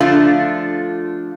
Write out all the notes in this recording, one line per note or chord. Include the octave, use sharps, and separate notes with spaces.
D3 F3 A3 D4 F4